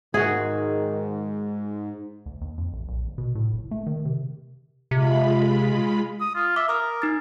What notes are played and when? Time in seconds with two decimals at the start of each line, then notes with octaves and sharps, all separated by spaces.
0.14 G#2 D#3 F#4 G#4
2.26 D2
2.41 D#2
2.58 F2
2.73 A1
2.88 A#1
3.05 G#1
3.18 B2
3.35 A2
3.53 F#1
3.71 A3
3.87 D#3
4.05 C3
4.91 C3 G#3 F4 B5
6.21 D#6
6.35 F4
6.56 E5 D6
6.68 A#4 D6 D#6 F6
7.02 D#4 A6